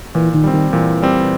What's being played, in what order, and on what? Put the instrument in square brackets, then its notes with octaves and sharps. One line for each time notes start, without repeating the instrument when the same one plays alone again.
[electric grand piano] A#2 [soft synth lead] E3
[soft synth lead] D#3
[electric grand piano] G3 C4
[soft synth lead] D#3
[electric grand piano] A#2 [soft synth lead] E3
[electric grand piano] G3 C4